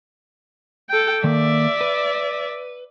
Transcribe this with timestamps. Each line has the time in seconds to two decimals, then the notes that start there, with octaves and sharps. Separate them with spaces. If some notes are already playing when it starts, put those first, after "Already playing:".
0.90 A4 G5
1.24 D#3 A#3 D5 E5
1.81 B4